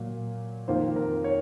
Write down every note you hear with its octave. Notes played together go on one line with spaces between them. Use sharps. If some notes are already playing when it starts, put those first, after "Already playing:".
Already playing: A#2 F#3 A#3
F2 D#3 A#3 F4 C5
A#4
C#5